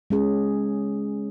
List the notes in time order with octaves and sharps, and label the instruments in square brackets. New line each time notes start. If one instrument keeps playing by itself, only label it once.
[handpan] G#3 C#4 G#4